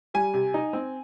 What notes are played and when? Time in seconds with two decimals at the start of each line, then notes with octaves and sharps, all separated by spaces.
0.14 G3 G#5
0.34 C3
0.54 D#4
0.73 C4